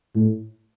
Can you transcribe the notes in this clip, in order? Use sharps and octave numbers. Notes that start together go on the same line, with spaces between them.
A2